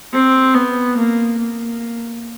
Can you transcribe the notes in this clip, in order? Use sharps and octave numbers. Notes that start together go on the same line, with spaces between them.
C4
B3
A#3
A#3